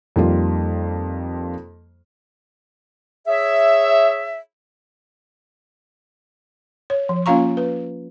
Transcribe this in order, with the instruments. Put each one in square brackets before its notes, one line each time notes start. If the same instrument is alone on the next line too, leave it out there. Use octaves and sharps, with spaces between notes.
[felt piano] F2 D#3 G3 A#3 F4
[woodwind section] G#4 C#5 E5
[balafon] C#5
F3
A#3 C#4 F4 F5 A#5 C#6
B4